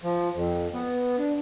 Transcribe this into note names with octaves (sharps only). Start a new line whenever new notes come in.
F3
F2
B3
D4